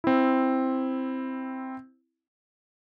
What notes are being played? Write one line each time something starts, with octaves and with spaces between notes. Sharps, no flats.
C4 E4